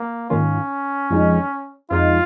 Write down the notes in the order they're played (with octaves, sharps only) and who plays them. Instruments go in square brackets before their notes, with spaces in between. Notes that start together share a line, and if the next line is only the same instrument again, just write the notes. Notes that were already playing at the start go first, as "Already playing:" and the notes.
Already playing: [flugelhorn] A#3
[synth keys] G#2 D#3 A#3 F4 [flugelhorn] C#4
[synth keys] F2 F3 G#3 D#4
[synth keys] F2 F3 G#3 D#4 [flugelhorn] F4